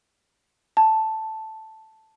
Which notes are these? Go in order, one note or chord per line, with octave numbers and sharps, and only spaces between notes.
A5